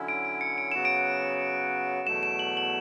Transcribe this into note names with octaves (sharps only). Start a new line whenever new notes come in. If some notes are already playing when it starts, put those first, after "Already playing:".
Already playing: D3 F#3 C#4 E4
D7
D7
C#7
D7
C#3 F#3 B3 F#4 E7
D7
E2 B2 F#3 A3 E7
E7
F#7
F#7